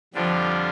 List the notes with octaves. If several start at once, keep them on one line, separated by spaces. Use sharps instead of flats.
F2 D3 F3 G3 D4 F4